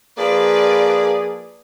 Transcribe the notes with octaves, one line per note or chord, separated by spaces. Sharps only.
F3 A#3 G#4 B4 D5